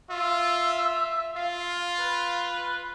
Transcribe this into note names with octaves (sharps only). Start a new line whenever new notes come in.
F4 E5
F4 F5
B4